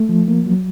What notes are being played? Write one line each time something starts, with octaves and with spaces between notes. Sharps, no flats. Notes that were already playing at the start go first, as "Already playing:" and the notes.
Already playing: A3
F3
A#3
F#3